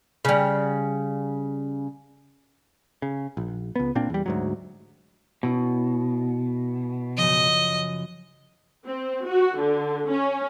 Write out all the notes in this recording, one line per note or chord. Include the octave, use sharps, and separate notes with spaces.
C#3 G3
C#3
A#1
C#2 B3
A#2 A#3 C4 D4
E2 G3
D2 G#2 F#3
B2 C#4 E4
F#2 C#3 F3 D#5
C4
F#4
D3
C#4